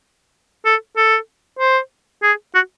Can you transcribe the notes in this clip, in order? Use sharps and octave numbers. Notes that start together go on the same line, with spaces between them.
A4
A4
C5
G#4
F#4